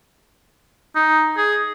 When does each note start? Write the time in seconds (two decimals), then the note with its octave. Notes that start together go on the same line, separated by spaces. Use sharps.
0.95 D#4
1.37 G#4